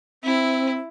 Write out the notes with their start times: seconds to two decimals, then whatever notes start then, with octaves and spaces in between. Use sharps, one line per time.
0.24 C4 E4